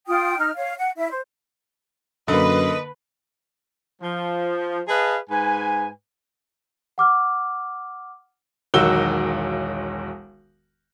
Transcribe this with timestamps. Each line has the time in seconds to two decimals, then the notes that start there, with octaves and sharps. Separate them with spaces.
0.07 F4 G5 D#6
0.38 D#4 F6
0.56 C#5 F5
0.78 F#5
0.97 E4 E5
1.10 C5
2.28 F#2 D3 A#3 B4 D#5
4.02 F3
4.88 G#4 B4 D#5 F5 A5
5.30 G#2 B4 G#5
6.98 F#5 D6 F6
8.74 E1 B1 D#3 F#4 E6 G7